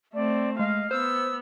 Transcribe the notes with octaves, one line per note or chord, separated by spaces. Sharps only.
A3 C4 D5
G#3 D#5 F5
B3 C5 E6